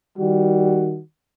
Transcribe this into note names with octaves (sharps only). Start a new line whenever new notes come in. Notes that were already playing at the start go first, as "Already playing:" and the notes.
D#3 G3 F#4